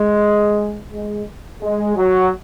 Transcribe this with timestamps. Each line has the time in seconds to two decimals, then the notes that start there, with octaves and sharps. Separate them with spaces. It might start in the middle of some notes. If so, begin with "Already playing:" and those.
Already playing: G#3
0.91 G#3
1.61 G#3
1.96 F#3